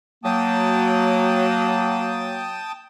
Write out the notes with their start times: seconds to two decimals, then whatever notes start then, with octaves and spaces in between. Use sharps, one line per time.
0.24 F#3 A#3 G5 A5 D#6